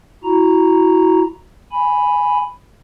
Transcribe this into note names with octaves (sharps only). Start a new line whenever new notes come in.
E4 F#4 A#5
G#5 B5